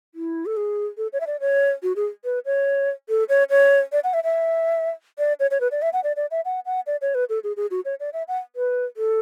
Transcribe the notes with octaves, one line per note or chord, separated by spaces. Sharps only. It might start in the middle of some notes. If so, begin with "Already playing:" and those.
E4
A4
G#4
A4
C#5
E5
D5
C#5
F#4
G#4
B4
C#5
A4
C#5
C#5
D5
F#5
E5
E5
D5
C#5
C#5
B4
D5
E5
F#5
D5
D5
E5
F#5
F#5
D5
C#5
B4
A4
G#4
G#4
F#4
C#5
D5
E5
F#5
B4
A4